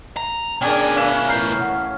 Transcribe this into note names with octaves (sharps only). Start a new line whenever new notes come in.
A#5
B2 C#4 D4 G#4 A#4 D5 G5 G#5
C#4 B4 E5 F5 G#5
A2 E3 F5 A#5 G6 C7
F#5